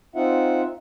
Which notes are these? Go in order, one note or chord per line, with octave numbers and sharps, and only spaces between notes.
C4 D#4 F4 E5 F#5